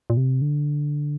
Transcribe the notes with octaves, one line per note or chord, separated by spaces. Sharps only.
A#2
C3
D3